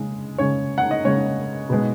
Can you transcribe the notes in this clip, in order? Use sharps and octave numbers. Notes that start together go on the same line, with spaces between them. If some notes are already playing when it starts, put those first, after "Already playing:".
Already playing: C#3 G#3 C#4
C#3 G#3 C#4 C#5
F#5
D#5
C#3 G#3 C#4 C#5
B2 G#3 B3